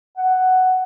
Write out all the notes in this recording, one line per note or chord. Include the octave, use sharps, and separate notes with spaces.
F#5